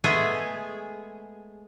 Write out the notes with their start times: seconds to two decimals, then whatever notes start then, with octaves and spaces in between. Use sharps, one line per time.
0.04 G#3 A3 B3 G#4